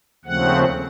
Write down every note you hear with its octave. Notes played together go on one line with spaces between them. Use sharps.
D#2 C#3 F3 A3 C4 F#5